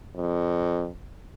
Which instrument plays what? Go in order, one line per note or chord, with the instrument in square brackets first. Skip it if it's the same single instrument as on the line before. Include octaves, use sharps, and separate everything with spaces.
[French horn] F2